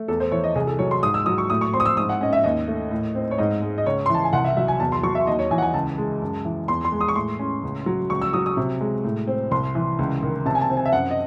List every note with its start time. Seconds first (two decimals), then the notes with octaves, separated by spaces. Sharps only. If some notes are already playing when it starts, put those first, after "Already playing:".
Already playing: A3
0.08 E2 A4
0.20 C5
0.31 E3 C#5
0.44 D#5
0.55 C2 G#4
0.67 A4
0.79 F#3 C#5
0.91 C6
1.03 G#2 D#6
1.14 E6
1.26 F#3 D#6
1.38 C#6
1.50 A2 D#6
1.61 C#6
1.73 C4 C6
1.80 D#6
1.86 E6
1.97 G#2 D#6
2.09 F#5
2.21 C#4 D#5
2.33 E5
2.44 D#2 D#5
2.68 A3
2.91 A2
3.15 C4
3.31 C#5
3.38 G#2 D#5
3.62 G#3
3.78 D#5
3.86 C#2 C#5
4.06 E3 C6
4.15 A5
4.24 G#5
4.33 C2 F#5
4.44 E5
4.57 F#3 E5
4.68 G#5
4.80 E2 A5
4.92 C6
5.03 F#3 C#6
5.15 E5
5.27 D#2 D#5
5.39 C#5
5.51 E3 G#5
5.58 F#5
5.62 G#5
5.74 C#2 A5
5.98 G#3
6.22 F#2
6.45 E3
6.68 E2 C6
6.85 C6
6.92 G#3
7.01 D#6
7.08 C#6
7.16 A2 C6
7.39 C#4
7.63 C#2
7.86 F#3
8.10 C#2 C#6
8.22 E6
8.33 F#3 D#6
8.46 D#6
8.57 C3
8.81 G#3
9.04 A2
9.27 C4
9.51 C2 C6
9.75 E3
9.99 C#2
10.23 D#3
10.46 C3 A5
10.55 G#5
10.61 A5
10.70 C4
10.77 G#5
10.85 E5
10.93 F#2 F#5
11.11 D#5